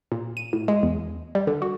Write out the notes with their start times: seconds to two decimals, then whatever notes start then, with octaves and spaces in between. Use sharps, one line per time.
0.12 A#2
0.37 D#7
0.53 A2
0.68 G#3
0.83 E2
1.35 G3
1.47 D3
1.62 F#4